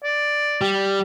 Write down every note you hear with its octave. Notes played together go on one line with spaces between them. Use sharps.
D5
G3